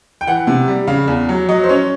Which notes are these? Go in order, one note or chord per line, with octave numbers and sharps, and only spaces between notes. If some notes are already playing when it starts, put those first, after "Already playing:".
G5
E3 F#5
C3
G3
C#3 F5
E2
F#3
F#3 D#5
C5
C#4 C#5